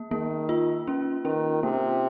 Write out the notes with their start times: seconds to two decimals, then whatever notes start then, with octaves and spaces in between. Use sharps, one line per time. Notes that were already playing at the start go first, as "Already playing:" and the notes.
Already playing: A#3
0.11 D#3 A#3
0.49 F4
0.87 C#4
1.25 D#3 C#4
1.63 C3 A#3